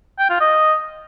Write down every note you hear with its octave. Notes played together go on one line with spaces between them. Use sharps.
G5
F4
D#5